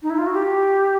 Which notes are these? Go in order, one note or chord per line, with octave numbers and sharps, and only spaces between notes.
D#4
E4
F4
F#4
G4